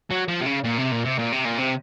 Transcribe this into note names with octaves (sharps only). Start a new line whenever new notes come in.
F#3
F3
C3
C#3
A#2
C3
A#2
C3
A#2
C3
A#2
C3